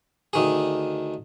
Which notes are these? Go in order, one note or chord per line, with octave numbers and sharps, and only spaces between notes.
D2 D#3 G#4